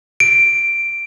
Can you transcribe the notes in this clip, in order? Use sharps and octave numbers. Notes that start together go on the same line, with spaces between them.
D7